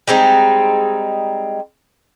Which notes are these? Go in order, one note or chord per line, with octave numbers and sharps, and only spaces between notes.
G3 G#3 C4 D#4